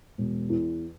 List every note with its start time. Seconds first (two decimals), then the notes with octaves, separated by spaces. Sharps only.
0.18 E1
0.50 E2